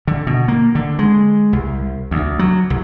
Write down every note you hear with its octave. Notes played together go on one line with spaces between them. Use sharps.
D3
B2
A#3
D3
G#3
C2
D2
F#3
C2